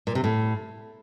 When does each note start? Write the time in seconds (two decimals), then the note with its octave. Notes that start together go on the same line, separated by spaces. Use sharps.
0.07 A#2
0.15 C3
0.24 A2